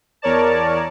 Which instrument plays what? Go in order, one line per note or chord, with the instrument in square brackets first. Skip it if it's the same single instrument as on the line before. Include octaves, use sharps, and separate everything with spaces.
[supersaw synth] E2 A#4 C#5 D5 A5